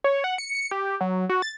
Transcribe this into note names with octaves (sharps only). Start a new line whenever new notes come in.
C#5
F#5
C#7
C#7
G4
F#3
F#4
A6